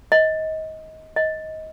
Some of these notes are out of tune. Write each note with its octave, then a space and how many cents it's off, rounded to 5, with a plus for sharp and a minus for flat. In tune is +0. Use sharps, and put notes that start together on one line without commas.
D#5 +25
D#5 +20